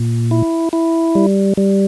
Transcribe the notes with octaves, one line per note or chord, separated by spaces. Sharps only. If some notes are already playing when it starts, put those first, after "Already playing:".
Already playing: A#2
E4
E4
G3
G3